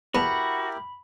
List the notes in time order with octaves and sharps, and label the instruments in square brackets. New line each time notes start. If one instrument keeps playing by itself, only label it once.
[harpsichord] E2 B3 A5 [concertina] E4 G4 A#4 [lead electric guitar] F#4 [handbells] B5